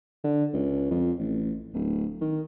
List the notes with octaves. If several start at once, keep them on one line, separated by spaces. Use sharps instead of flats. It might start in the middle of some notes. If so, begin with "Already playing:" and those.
D3
C#2
F2
A1
D1
D#3